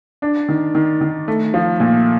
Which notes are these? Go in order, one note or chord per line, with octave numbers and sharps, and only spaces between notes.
D4
D#3
D#3
D#3
A3
F3
A#2